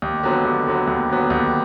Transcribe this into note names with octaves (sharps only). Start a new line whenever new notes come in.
D#2
D3 F#3 B3
D#2
D3 F#3 B3
D#2
D3 F#3 B3
D#2